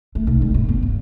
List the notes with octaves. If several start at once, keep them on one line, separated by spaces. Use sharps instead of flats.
A3
B1
G3
G2
B3
G2